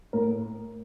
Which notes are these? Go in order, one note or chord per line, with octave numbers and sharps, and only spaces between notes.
A2 A#4